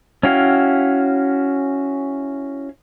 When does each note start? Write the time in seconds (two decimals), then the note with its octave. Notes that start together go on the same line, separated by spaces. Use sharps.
0.23 C#4 E4 F#4 F5 G5